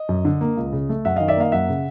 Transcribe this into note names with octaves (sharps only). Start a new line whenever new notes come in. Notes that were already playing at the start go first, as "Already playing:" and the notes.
Already playing: D#5
F#2
D3
A#3
C#2
C#3
A3
F#2 E5 F#5
D#3 D#5 F5
D5 E5
A#3 D#5 F5
F#2 E5 F#5
C#3